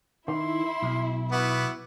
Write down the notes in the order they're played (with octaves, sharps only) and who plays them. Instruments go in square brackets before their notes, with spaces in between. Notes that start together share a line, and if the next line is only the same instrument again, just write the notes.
[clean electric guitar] D#3 [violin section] E4 [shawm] C6
[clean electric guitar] B1
[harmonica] B3 E4 F#4 [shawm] D6